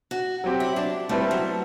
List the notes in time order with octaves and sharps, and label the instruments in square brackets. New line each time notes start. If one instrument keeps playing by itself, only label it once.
[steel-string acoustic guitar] F#4
[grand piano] F#3 C4 G4
[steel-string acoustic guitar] E4
D4
[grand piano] G3 C4 E4 B4 [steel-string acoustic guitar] A3
[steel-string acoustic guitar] F#3